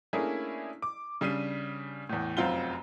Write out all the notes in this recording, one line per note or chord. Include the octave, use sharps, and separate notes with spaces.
A3 A#3 C#4 D4 E4 G#4
D6
C#3 G3 D4 C7 D#7
E2 A2
F1 F#2 C4 F4 F#5 G7